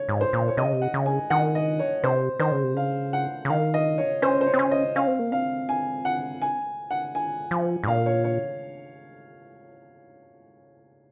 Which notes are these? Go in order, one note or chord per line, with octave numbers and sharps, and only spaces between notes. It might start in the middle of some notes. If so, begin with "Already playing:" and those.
Already playing: C#5
G#2
C5
A#2
C#5
C3 D#5
C#3
C3
F#5
C#3
G#5
D#3 F#5
D#5
C#5
C3 C5
D#3 C5
C#3
C3
C#3 F5
F#5
C#3
D#3 F5
D#5
C#5
C#4 C5
C5
C#5
C4
C#4
D#5
C#4 F5
C4
A#3
C4 F5
G#5
F#5
G#5
F#5
G#5
F3
G#2
A#2 F5
C#5
C#5